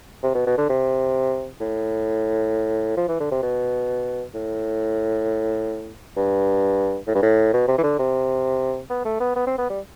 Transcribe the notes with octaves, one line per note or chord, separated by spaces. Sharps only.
C3
B2
B2
D3
C3
A2
F3
E3
D3
C3
B2
A2
G2
A2
G2
A2
B2
C3
E3
D3
C3
B3
A3
B3
B3
C4
B3
G3